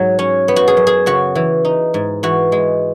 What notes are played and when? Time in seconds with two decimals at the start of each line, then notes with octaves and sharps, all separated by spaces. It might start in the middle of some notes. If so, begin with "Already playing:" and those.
Already playing: G#2 F#3
0.19 C#4
0.48 B3
0.56 F#4
0.68 G#4
0.77 F#2
0.87 G#4
1.06 C#3 F#4
1.35 E3
1.65 D#4
1.94 G#2
2.23 E3 F#4
2.52 G#3